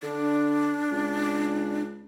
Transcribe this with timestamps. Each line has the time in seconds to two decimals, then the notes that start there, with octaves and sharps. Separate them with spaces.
0.03 D3 D4
0.91 C#2